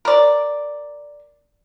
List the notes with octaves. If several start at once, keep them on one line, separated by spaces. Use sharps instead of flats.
A#4 D5